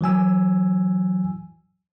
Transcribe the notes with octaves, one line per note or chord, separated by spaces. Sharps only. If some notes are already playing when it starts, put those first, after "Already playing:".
E3 F#3 G#5 E6